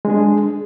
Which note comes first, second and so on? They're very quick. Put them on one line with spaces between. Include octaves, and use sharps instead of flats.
G#3 D4 G#4